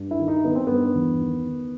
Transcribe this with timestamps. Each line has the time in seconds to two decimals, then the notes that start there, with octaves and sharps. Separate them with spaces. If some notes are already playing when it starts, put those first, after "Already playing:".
Already playing: G2
0.11 E4
0.19 D#3
0.28 D#4
0.44 D#3 B3
0.55 C4
0.67 G2 B3
0.95 E2
1.21 D#3
1.46 D#3